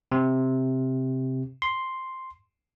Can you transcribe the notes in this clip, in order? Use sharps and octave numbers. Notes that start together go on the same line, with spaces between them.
C3
C6